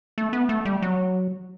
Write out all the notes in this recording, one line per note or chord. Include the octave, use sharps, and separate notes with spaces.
A3
B3
A3
G3
F#3